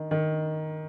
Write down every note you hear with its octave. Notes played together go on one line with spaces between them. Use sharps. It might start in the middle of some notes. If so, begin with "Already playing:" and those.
Already playing: D#3
D#3